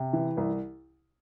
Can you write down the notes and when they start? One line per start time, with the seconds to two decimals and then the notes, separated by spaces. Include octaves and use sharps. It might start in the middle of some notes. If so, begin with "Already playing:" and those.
Already playing: C3
0.13 E3
0.37 C2